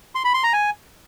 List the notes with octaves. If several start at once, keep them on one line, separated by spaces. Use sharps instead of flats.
C6
B5
C6
A#5
G#5